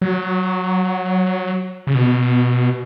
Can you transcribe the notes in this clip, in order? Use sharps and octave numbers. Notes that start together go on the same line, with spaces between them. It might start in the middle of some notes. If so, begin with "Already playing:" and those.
F#3
C#3
B2